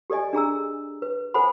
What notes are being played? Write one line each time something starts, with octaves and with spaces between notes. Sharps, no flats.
G4 A4 D5 D#5 G#5
D4 G#4 A#5 E6
B4
A4 C5 F#5 G#5 B5